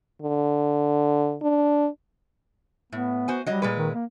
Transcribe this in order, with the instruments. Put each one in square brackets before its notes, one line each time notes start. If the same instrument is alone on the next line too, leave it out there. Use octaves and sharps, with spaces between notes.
[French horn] D3
D4
[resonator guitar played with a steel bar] A2 [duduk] B3
[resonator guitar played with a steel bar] F#4 C5 G#5
[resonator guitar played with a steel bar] F#3 D#5 [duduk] G3
[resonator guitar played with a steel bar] A#2 G#3 B4
[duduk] D#3
A#3